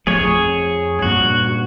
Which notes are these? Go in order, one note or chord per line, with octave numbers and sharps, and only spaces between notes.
A1 F3 A3 G#4 C#5
F2
G2 A#2 D4 F#4